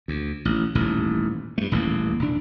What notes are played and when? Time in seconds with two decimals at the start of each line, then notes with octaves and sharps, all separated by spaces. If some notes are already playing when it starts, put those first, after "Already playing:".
0.08 D2
0.45 A1
0.75 D#1 A1 G#2
1.58 G2 A3
1.72 D#1 A1 E2 A#3
2.19 E1 D4